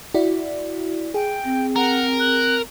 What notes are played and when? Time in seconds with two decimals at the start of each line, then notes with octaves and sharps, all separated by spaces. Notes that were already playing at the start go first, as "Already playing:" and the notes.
0.14 E4 F#4 D5
1.14 G#4 G5
1.44 C4
1.76 A#4 F#5
2.20 F#6